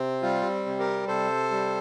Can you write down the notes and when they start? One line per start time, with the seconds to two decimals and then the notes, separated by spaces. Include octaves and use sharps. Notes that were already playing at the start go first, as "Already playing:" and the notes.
Already playing: C3 C4
0.22 G3 F4
0.66 C3
0.79 G4 A#4
1.08 C3 A4 C5
1.51 G3